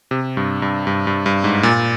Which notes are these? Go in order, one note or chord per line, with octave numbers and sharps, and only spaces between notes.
C3
G2
G2
G2
G2
G2
G#2
A#2